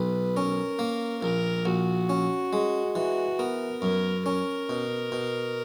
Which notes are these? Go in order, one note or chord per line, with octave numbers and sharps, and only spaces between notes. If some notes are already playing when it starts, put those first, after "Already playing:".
Already playing: B1 B4
C#4 A#4
A#3
A#1 A#4
A#1 F#4
C#4
G#3
E3 F#4
B3 A#4
F#2 A#4
C#4 A#4
B2
B2